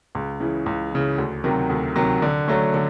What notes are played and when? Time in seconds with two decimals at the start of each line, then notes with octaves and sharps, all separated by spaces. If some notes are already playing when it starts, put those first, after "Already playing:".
0.15 C#2
0.40 C#3 E3
0.66 C#2
0.92 C#3 E3
1.18 D2
1.44 C3 D#3 F#3
1.70 D2
1.96 C3 D#3 F#3
2.22 D3
2.48 F#3 A3 C#4
2.74 D3